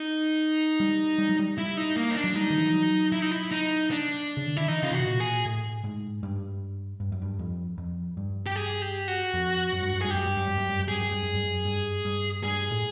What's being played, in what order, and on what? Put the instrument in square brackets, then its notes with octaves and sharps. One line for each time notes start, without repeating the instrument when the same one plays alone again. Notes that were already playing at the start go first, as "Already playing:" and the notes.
Already playing: [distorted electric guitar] D#4
[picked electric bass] G3
G3
F#3
G3
[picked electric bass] G3 [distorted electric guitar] E4
[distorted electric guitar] D#4
A#3
D#4
D4
[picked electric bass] F#3
[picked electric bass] G3 [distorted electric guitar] D#4
[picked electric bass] D#3
E3
F3
F#3
[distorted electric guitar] E4
D#4
E4
D#4
D4
[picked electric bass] C#3
D3
[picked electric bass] D#3 [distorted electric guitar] E4
[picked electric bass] E3 [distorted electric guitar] D#4
[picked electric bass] C#3 [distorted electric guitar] F4
[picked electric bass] C3 [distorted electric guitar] F#4
[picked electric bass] B2
A#2
[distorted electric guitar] G#4
[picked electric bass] A2
G#2
G2
G2
F#2
G2
F2
F2
G2
[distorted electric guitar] G4
G#4
G4
F#4
[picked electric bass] F2
F#2
G2
F#2
[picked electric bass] G2 [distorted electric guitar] G#4
[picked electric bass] F#2 [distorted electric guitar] G4
[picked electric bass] G2
F#2
G2
F#2
G2
F#2
[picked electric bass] G2 [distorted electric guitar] G#4
[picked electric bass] F#2
G2
F#2
G2
F#2
G2
G2
[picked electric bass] G2 [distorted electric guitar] G#4
[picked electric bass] A2